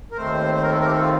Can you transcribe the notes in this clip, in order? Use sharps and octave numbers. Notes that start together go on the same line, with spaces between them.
A#4
D#2 D#3 A3 C4 C5
C5
A#4
A4
A#4
G4
A4
F4